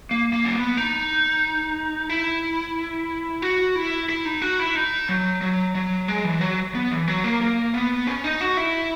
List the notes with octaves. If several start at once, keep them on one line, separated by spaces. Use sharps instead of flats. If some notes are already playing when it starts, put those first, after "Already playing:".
A#3
A#3
C#4
B3
D#4
E4
F#4
E4
E4
D#4
F#4
E4
D#4
F#3
F#3
F#3
G#3
E3
F#3
B3
E3
F#3
A#3
A#3
B3
C#4
D#4
F#4
E4